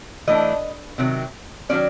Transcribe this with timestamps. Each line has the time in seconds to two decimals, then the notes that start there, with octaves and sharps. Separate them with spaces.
0.27 E3 A3 D4 D#5
0.98 C3 D#3 F#3
1.69 D#3 F#3 A#3 C#4 D5